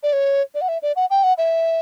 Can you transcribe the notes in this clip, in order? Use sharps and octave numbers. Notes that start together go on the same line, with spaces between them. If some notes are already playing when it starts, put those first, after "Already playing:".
D5
C#5
D5
F#5
E5
D5
F#5
G5
F#5
E5